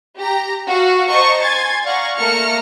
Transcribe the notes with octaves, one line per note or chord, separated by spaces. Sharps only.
G4 A#5
F#4 F5
C5 D#5 A5 A#5 C#6
G#5 C6 G#6 A6
D5 F5 F#5 A#5 C#6
A3 A#3 A#5 F6 C#7